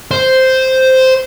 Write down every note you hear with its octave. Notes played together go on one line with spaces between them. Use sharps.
C5